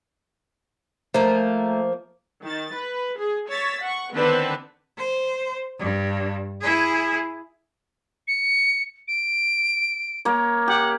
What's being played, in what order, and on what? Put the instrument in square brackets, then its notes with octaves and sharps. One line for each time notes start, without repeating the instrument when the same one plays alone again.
[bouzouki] F3 A#3 [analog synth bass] A3
[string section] D#3 A6
B4
G#4
C#5 E6 A6 B6
F#5 C#6
D3 D#3 B3 C4 D4 B4
[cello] C5
G2
E4 G#4
[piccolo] C#7
D7
[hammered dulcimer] A#3 C#5
[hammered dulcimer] G4 [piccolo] F#5